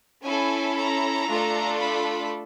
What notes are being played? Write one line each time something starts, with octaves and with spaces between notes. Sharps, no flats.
C#4 E4 A4 G#5
A#5
A3 D4 F4 A4
B5